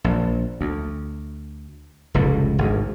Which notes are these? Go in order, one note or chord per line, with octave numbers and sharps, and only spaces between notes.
A#1
D2
F1 C#2 A2
G#1 D2